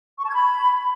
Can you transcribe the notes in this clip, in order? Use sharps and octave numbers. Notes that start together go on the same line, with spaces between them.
C#6
A5
G#6
B5